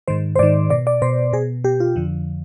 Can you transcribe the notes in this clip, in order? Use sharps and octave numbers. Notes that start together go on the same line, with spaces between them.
G#2 D#3 C5
C5
G#2 D#3 D5
B2 D5
D5
B2 C5
B2 G#4
B2 G4
F4
F2 D3 F3